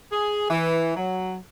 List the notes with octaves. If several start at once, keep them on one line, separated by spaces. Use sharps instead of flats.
G#4
E3
F#3